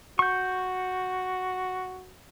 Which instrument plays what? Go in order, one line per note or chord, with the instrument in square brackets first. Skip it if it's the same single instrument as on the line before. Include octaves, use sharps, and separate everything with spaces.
[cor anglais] F#4 [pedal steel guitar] C#6 G6